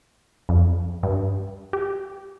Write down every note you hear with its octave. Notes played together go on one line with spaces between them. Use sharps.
F2
G2
G4